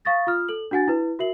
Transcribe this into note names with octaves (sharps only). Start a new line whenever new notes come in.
F5 C#6 D#6 A6 A#6
F4 D#6 F6
A4 F#7
D4 F#4 F#5 G#5 A6
E4 B4
F#4 A#4 E5 C7 F#7